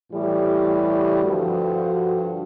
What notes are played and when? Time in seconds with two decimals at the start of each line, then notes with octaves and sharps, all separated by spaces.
0.12 A2 E3 G3 G4
1.22 G2 D3 F3 F#4